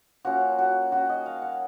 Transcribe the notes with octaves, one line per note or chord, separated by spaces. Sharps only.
F3 A#3 C#4 F#4
F#4
D#3 A#3 C#4 F#4
D#5
F5
F#5